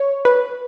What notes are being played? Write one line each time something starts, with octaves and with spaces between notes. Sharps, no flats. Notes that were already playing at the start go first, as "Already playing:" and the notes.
Already playing: C#5
B4